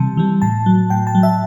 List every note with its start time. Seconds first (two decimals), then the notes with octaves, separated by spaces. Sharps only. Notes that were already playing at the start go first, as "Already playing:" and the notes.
Already playing: C3 E3 G3 A5
0.17 E3 G3
0.42 A2 A5
0.66 F#3
0.90 A2 G5
1.07 A5
1.15 F#3
1.23 E5